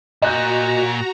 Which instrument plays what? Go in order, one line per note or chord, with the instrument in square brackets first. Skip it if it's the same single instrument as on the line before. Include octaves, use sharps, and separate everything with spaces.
[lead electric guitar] A#2 [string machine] F#4 A#5 [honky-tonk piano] D#5 F#6 G6